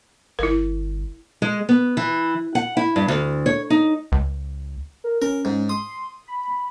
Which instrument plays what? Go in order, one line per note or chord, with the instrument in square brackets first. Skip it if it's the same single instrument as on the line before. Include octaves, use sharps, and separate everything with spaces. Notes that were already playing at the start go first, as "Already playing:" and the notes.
[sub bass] G1 [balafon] E4 A#4
[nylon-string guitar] G#3
B3
E3
F#5
E4
G2
D2
C#5
D#4
[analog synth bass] C#2
[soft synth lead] A#4
[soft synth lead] C#4 [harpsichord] A#4
[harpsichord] G#2
[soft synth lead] C6 [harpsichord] D#6
[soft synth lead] B5